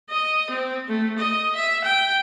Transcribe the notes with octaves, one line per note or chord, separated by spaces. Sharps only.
D#5
C4
A3
D#5
E5
G5